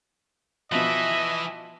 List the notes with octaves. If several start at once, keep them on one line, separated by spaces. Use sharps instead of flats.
B2 E3 F3 D#5 E5